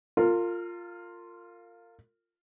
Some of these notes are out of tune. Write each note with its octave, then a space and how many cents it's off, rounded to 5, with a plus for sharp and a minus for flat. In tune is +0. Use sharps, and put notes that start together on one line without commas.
F4 +0 A#4 -35